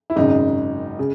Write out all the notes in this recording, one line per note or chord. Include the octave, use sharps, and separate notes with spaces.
E4
G#1 F#2 C#3 D#4
C#3